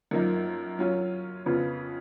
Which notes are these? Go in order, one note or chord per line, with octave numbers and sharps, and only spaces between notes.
F#2 F3 A#3 D#4
F#3 C#4 F4
F2 C#3 F3 B3 F4